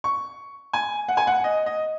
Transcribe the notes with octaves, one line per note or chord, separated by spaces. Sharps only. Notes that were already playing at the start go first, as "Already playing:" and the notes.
C#6
G#5
F#5
G#5
F#5
D#5
D#5